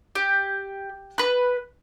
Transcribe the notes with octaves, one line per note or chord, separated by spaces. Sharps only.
G4
B4 F#6